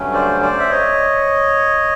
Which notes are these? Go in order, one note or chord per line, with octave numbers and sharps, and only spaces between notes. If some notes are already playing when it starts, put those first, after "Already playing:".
Already playing: G2 D3 F#3 A3 C#4
C5 D5
C5 D5
E5
C#5 D#5